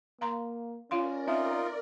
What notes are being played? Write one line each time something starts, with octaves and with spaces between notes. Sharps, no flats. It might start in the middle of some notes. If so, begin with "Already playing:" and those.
A#3 F5 A#5 C6
C#4 F4 A#4 D5 F5 C6
C4 D#4 F4 E5